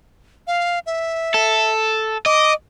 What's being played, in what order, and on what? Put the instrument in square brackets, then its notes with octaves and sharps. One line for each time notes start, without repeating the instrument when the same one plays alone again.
[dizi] F5
E5
[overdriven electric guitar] A4
[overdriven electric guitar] D#5 [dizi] D6